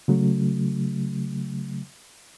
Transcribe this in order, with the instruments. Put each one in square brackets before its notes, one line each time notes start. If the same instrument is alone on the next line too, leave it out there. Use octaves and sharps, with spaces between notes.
[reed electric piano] C#3 F#3 A3